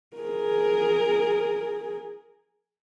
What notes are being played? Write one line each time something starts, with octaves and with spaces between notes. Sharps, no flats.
G#4 A#4